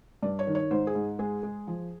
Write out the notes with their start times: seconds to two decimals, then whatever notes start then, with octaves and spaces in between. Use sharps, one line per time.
0.23 G2 D5
0.39 C#5
0.47 D#3
0.55 C#5
0.71 G#2 C5
0.87 G#4
0.95 G#2
1.19 G#3 G#4
1.43 G#3
1.67 F3